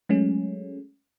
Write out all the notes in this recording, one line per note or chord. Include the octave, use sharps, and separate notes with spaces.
F#3 G#3 A3 C#4